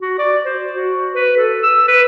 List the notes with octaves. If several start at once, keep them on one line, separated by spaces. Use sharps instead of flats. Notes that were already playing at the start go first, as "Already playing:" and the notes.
F#4
D5
C5
F#4
B4
A4
E6
B4